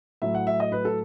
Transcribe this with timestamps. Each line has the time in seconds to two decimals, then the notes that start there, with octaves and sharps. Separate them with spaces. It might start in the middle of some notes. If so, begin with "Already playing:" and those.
0.22 A2 F#3 E5
0.35 F#5
0.47 E5
0.60 D#5
0.72 B4
0.85 A4